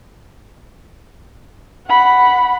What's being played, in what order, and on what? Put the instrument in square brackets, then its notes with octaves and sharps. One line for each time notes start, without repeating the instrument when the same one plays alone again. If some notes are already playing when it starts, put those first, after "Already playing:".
[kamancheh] F#5 B5